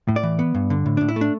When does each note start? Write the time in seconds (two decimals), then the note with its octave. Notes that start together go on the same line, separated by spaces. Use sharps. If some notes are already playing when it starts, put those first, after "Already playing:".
0.08 A2
0.16 D5
0.23 E3
0.39 B3
0.55 G2
0.70 D3
0.86 A2
0.97 A2 D4
1.09 E4
1.16 A3
1.21 D4